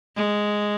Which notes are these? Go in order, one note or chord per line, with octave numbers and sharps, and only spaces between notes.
G#3